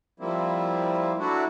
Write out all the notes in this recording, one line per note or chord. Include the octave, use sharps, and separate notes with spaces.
F3 G3 A#3 C4 E4
F#3 A3 D4 E4 F#4